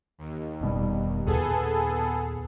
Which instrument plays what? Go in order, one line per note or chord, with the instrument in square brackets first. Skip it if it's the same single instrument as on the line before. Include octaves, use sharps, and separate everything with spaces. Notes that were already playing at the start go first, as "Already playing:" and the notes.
[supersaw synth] D#2
[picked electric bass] F1 B2 G3
[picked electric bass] D#2 A#2 [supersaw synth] B3 G#4 A4